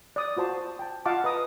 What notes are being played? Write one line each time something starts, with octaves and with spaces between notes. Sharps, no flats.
D5 D#6
F4 F#4 C5 A5 C6
G5 A5
F4 D#5 F5 F#5 A5 D6
B4 D#5 A#5 D#6